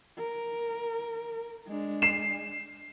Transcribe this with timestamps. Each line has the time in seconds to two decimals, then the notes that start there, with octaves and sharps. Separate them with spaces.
0.18 A#4
1.68 G#3 D4
2.02 C7 E7